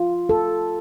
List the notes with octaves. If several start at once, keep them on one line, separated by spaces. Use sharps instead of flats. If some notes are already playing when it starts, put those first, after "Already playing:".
Already playing: F4
A4